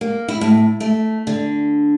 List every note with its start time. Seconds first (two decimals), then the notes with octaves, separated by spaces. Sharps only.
0.01 A#3
0.28 E4
0.41 A2
0.80 A3
1.27 D3